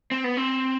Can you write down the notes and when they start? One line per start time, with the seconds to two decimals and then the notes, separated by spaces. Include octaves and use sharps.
0.11 C4
0.24 B3
0.37 C4